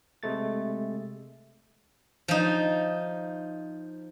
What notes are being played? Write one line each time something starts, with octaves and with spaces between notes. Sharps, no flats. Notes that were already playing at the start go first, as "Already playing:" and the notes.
C3 G#3 A3 A6
F3 D#4